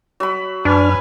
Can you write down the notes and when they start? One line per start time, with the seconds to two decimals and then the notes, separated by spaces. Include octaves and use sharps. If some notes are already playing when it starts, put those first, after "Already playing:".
0.20 F#3 B5
0.65 F#2 D4 B4 G#5 F6